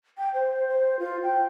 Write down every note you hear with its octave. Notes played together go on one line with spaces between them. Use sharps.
G5
C5
C5
F4
G5